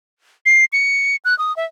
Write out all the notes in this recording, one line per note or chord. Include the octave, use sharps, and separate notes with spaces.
C7
C#7
F#6
D#6
E5